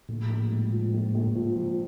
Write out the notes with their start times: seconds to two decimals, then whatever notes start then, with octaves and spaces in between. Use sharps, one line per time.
0.09 A#1 A2
0.30 A#1
0.51 G#2
0.72 F3
0.94 A#1
1.15 A#1
1.35 F3
1.56 F3